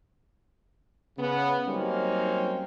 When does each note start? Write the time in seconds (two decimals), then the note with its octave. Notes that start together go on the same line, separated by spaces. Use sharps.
1.19 C#3 B3
1.67 F#3 G3 A#3 C4 C#4 D#4